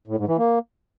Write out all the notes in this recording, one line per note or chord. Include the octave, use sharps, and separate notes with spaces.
A2
G#2
E3
A#3